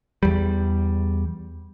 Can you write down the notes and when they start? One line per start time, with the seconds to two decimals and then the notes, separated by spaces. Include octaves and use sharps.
0.23 E2 G3